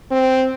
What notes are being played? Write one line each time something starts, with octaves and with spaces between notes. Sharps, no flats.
C4